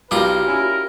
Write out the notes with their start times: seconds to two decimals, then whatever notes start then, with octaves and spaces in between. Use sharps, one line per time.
0.11 B1 G3 F4 F#4 A#4 A#5 D6
0.47 C#4 E4